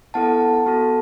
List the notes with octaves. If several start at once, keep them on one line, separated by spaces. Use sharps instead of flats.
B3 E4 A4 F#5 A5
B3 F#4 A4